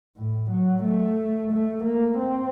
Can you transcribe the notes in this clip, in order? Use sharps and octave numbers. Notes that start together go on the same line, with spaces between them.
A2
F#3
A3
A3
A#3
C4